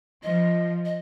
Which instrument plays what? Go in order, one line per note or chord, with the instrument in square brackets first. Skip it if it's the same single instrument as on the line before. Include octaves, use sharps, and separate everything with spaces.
[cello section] F3 [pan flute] D#5
[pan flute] D#5